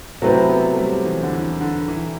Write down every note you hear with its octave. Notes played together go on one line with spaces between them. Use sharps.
C3 F#3 A3 C4 E4 B4
B3
A3
G3
E3
D3
E3
D3
E3